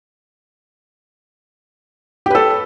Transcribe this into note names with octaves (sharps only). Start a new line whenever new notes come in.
G4 A4 B4